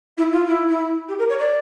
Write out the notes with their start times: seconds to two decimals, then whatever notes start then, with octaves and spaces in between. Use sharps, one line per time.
0.17 E4
0.32 F4
0.47 E4
0.69 E4
1.08 G4
1.18 A#4
1.29 C#5
1.38 D5